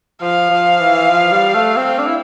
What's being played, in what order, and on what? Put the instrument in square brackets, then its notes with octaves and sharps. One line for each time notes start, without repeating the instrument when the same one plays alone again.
[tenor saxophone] F3 [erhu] F5
[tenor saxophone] F3
E3
F3
G3
A3
C4
D4
E4